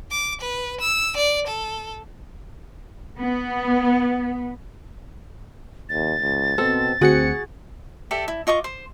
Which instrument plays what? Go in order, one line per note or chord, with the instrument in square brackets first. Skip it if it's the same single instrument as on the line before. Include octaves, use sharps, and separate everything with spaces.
[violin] D6
B4
E6
D5
A4
[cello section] B3
[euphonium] D#2 [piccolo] A6
[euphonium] C#2
[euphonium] B2 [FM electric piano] C4 [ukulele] A4
[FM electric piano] D2 F#5 C#7 [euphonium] C4 [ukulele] F#4 G#4
[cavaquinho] G4 A4 D5 E5
E4
F4 D#5 C#6 D6
C5